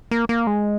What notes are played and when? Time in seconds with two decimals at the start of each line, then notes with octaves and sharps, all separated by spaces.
0.11 A#3
0.29 A#3
0.47 G#3